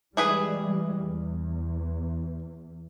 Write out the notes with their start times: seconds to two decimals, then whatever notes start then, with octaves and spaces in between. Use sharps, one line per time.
0.17 E3 G3 G#3 E4 G#4 B4
1.06 E2